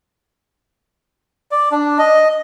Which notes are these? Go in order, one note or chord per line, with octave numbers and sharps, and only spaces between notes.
D5
D4
D#5